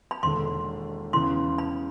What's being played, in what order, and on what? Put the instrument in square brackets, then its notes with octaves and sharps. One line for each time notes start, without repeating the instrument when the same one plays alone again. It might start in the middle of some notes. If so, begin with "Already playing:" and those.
[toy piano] B5
[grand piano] E1 D#2 D3 [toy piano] C6
[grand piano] E2 C#3 E3 [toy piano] C6
[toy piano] B5